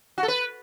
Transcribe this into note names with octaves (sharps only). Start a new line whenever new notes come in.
F#4
A4
B4